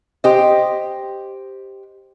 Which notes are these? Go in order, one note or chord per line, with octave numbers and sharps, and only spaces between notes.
G4 C5 D#5